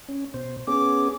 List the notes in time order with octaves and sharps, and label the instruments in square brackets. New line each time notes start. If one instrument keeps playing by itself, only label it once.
[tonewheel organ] C#4
B2 C5
[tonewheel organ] B3 C#4 G#4 [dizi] D6